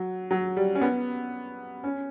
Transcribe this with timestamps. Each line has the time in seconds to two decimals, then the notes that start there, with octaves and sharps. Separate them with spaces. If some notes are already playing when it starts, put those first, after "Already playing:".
Already playing: F#3
0.31 F#3
0.57 G3
0.75 C#4
0.82 B3
1.84 C#4